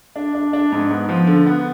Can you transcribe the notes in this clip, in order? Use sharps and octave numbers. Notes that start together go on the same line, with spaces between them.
D4
D4
D4
G#2
B3
F3
D3
B3